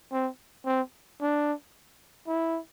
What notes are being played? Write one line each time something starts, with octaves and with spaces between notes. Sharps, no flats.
C4
C4
D4
E4